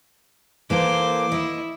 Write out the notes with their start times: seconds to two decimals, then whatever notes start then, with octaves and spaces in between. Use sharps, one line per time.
0.70 E3 A#3 A4 C5 D6
1.32 E4 D#5 E5